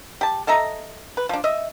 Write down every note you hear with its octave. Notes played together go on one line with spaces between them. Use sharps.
G4 A5
A4 D#5 E5 A#5
B4
F3 D4
D#5 E5